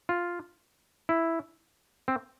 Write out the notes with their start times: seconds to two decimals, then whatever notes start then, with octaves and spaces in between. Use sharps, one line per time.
0.09 F4
1.09 E4
2.08 C4